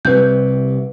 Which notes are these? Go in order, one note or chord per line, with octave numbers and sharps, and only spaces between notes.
C2 C3 B4 G6